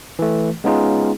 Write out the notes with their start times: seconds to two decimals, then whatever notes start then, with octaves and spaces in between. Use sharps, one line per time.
0.19 E3 A3
0.64 G#3 B3 C#4 D#4 F4 G#4